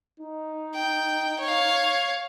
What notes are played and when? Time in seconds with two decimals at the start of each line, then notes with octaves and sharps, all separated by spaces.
0.20 D#4
0.74 G5
1.40 C#5 F5